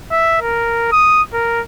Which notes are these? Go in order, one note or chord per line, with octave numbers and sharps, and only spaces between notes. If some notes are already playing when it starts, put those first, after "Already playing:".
E5
A#4
D#6
A#4